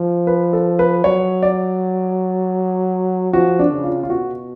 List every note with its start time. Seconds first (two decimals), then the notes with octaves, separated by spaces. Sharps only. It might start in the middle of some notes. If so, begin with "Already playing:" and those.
Already playing: F3
0.27 B4
0.53 A4
0.79 B4
1.04 F#3 C#5
1.43 D5
3.33 F3 F#4
3.59 D4
3.72 C#3
3.84 F4
4.03 F4
4.10 B2 F#4